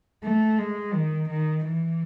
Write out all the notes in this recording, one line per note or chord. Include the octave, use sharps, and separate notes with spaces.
A3
G#3
D#3
D#3
E3